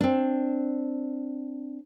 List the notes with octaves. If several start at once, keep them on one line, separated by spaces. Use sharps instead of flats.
C4 D4